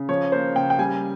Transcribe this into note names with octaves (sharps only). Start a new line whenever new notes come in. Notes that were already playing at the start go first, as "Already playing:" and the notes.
Already playing: C#3
F3 C#5
A#3 C5
C#3 G5
G5
G3 G#5